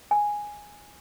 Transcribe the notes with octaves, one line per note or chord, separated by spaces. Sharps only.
G#5